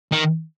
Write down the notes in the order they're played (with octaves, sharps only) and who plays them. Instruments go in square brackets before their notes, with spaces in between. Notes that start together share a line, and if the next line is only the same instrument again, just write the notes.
[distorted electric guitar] D#3